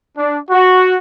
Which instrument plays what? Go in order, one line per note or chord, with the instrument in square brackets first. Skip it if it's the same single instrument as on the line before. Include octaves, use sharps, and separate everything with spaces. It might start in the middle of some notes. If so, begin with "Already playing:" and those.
[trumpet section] D4
F#4